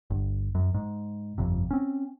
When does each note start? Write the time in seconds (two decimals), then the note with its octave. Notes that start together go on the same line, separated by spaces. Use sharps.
0.10 G1
0.55 F#2
0.74 G#2
1.38 G1 F2 C3
1.71 C4 C#4